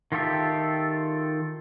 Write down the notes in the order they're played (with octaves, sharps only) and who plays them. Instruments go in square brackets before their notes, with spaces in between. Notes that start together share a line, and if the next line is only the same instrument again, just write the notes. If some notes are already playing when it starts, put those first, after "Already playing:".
[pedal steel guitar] D#3 F4 G4 A4 E5